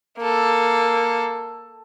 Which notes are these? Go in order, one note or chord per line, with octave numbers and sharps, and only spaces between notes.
A#3 A4